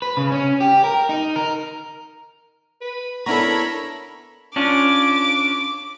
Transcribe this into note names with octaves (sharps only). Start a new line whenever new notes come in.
B4
C#3
C#4
G4
A#4
D#4
A#4
B4
B3 D4 E4 A4 A#4 C#5 A#5 B5
C#4 D4 F4 D6